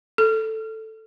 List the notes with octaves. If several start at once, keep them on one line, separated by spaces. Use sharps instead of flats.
A4